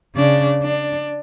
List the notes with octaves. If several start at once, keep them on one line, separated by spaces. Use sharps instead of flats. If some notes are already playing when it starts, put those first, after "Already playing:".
C#3 D4
D4